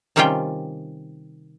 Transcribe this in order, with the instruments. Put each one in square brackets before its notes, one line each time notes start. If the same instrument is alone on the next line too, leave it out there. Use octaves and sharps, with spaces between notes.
[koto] C3 D#3 G3 C#4 F4 G5